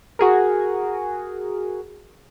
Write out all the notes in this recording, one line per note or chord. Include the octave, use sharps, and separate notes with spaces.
F#4 G#4 A#4